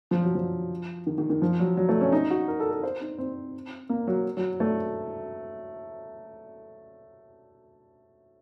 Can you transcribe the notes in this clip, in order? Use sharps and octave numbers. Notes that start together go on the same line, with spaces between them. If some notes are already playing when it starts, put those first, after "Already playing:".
F3
F#3
F3
D#3
D#3
D#3
F3
F#3
F#3
A3
C#4
D#4
F#4
A#4
A4
A4
C5
D#4
C4
A#3
F#3
F#3
A3